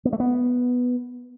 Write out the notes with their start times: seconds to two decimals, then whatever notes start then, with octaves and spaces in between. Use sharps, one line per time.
0.05 B3
0.13 A3
0.20 B3